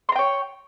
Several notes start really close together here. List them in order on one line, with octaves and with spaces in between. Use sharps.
C6 A#5 G5 C#5